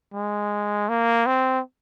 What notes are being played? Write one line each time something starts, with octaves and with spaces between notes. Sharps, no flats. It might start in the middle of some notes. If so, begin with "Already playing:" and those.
G#3
A#3
C4